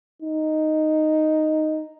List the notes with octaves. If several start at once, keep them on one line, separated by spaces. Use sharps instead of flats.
D#4